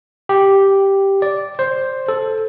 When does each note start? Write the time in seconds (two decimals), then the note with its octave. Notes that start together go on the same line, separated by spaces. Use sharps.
0.29 G4
1.22 D5
1.59 C5
2.08 A4